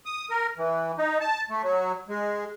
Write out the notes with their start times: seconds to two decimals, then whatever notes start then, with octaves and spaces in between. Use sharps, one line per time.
0.06 D#6
0.30 A#4
0.57 E3
0.98 D#4
1.20 A5
1.50 A3
1.63 F#3
2.09 G#3